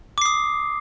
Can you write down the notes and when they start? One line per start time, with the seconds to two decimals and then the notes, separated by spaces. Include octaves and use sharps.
0.18 D6
0.22 C7
0.25 D#6